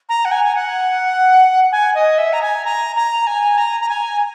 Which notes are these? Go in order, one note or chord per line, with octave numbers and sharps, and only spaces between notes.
A#5
F#5
G#5
G#5
F#5
G#5
D#5
E5
A#5
G#5
A#5
A#5
G#5
A#5
A#5
G#5